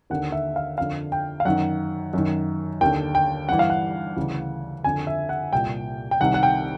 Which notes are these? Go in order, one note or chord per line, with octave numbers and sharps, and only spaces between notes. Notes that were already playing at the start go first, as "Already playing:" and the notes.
D#2 D3 F#5
E5
F5
F2 D3 F5
G5
F5
F#2 D#3 F#5
F#2 D#3
D#2 D3 G5
G5
G2 E3 F#5
F5
F#5
D2 C#3 E3
F2 D3 G#5
E5
F#5
C2 A#2 G5
G5
C2 C3 D#3 F#5
F#5
G5